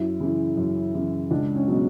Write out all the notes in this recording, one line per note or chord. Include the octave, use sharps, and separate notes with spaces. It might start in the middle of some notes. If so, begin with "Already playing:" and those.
Already playing: F#2 E4
C#3 E3
F#2
C#3 E3
C#2 D4
C#4
B2 F#3